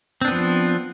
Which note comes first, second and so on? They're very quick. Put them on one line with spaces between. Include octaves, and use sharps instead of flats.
C4 D4 B3 F3